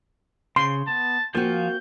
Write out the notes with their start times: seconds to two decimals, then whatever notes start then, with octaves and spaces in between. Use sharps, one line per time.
0.56 C#3 C6
0.88 B3 A5
1.35 F3 A#3 C4 F4 F#4 G#5 G6